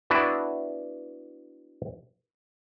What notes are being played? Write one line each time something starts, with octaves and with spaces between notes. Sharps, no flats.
B3 D4 E4 F#4 B4